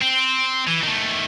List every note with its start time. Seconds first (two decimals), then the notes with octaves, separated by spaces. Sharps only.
0.02 C4
0.67 E3
0.83 D#3 A3